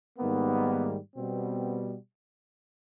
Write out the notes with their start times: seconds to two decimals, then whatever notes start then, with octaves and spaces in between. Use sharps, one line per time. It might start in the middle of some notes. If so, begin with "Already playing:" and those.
0.19 G#2 D#3 G3 A#3 B3
1.16 B2 G3 B3 C4